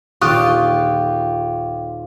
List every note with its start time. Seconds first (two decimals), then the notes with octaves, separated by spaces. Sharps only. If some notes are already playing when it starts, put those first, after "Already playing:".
0.21 D#1 F4 G4 C#6 D#6 F#6